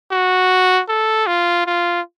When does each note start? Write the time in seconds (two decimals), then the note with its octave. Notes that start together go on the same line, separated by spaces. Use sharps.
0.12 F#4
0.89 A4
1.27 F4
1.66 F4